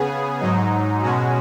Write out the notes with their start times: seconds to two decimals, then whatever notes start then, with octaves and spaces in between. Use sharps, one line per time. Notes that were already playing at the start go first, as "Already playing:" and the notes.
Already playing: C#3 B3 G#4
0.40 G#2 F#3 D#4
1.02 B2 G#3 C#4 F#4